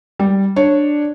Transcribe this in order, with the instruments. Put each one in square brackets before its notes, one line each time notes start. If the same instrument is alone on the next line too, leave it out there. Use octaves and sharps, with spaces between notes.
[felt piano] G3
[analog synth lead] D4 [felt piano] C#5